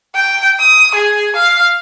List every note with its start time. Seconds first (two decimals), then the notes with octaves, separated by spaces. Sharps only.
0.16 G5
0.60 D#6
0.95 G#4
1.36 F5